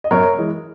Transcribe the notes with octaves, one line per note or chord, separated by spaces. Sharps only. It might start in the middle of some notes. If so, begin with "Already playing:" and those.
D#5
F#2 A#4 C#5
E3 G#3